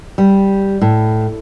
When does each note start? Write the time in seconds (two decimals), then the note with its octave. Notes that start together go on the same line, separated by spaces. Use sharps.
0.18 G3
0.81 A2